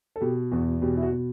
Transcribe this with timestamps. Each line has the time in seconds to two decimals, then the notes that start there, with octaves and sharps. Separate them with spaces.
0.16 A4
0.21 B2 G4
0.51 E2 F#4
0.82 B2 G4
0.97 E4
1.03 F#4
1.12 B2